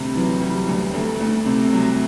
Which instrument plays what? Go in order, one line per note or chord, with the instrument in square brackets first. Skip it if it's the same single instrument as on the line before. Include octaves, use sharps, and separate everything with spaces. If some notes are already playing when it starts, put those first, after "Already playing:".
Already playing: [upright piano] D2 C3 G3
[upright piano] E3 [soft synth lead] F#3
[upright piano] G3
D2
[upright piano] D2 [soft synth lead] A3
[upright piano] D2
C3
F#3